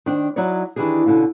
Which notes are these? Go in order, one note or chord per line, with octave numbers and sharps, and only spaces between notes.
D#3 D4 C5 G5
F#3 D#4 E4 C#5 D5
D#3 E3 B3 D4 G4 G#4
B2 D3 C#4 F4